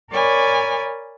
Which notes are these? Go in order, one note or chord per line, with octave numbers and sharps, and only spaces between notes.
A#4 C#5 D5 G#5 B5